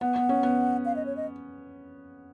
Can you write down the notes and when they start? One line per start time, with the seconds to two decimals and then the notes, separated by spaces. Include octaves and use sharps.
0.01 B3 F#5
0.16 B3
0.29 C#4
0.43 B3
0.85 F5
0.96 D#5
1.06 C#5
1.16 D#5